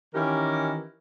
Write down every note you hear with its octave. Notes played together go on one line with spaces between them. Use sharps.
D#3 E3 C#4 G4 A#4